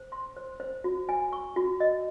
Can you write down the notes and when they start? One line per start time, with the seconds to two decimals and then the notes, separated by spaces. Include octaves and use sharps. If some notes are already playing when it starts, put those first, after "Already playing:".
Already playing: C5
0.12 C6
0.37 C5
0.60 C5
0.84 F#4
1.09 G#5
1.33 C#6
1.56 F#4
1.80 D#5